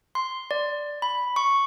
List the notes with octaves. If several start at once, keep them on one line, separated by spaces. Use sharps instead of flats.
C6
D5
B5
C#6